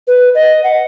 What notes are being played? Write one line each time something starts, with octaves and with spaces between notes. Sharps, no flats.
B4
D#5
F#5